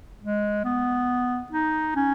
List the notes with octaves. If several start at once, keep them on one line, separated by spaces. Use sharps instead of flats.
G#3
B3
D#4
C#4